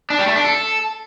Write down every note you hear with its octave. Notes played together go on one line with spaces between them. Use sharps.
D4
G3
A3
D4
A4